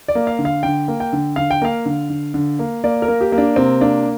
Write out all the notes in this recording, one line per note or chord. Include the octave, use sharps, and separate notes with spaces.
D5
A#3
F5
D3
F5
D3 G5
A#3
G5
D3
D3 F5
G5
A#3 F5
D3
D3
D3
A#3
A#3 D5
A#4
A#3
G4
A#3
D4
C3 C4
A#3 D4